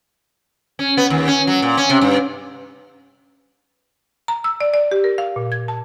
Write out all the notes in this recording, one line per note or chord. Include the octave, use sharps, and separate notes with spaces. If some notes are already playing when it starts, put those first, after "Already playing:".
C#4
B3
D#2
C#4
F#3
A#2
C#4
C3
G2
A#5
E6
D5
D5
G4
A#4
F5
A#2
G#6
A5